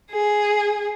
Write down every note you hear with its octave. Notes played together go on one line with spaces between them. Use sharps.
G#4